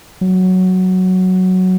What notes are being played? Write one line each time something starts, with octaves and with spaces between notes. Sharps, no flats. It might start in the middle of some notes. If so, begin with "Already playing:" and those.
F#3